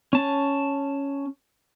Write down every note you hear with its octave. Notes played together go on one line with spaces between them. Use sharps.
C#4 A5